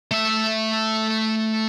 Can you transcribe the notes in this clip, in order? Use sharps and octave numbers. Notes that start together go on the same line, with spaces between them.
A3 E5